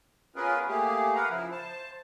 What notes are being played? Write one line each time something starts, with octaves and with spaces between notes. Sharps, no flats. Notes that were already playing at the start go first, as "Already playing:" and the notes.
B3 C#4 F4 G#4 A#4 B4
A3 A#3 G4 G#4
A#4 B4 F5 F#5 A#5
C#3 F3 E4
C5 A5